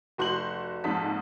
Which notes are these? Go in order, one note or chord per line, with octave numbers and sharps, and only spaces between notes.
F1 F#4 C6 G6 F#7
A#1 F2 G#2 D#4 A5 B6